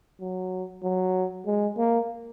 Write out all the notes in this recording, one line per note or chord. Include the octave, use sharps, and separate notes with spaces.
F#3
F#3
G#3
A#3